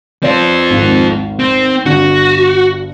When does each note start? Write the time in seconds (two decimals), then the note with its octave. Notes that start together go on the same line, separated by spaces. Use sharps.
0.23 C4 F4 B4 D5
0.70 G#1 D#2
1.39 C4
1.86 G1 G2 F#4